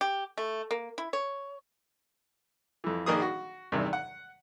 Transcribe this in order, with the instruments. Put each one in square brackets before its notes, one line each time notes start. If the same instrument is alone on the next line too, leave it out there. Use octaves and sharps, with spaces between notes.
[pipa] G4
A3
A#3
E4
C#5
[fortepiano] F2 E3
A#1 D#3 A#3 G#4 D#6
F#4
E2 G2 C3 D#3
F#5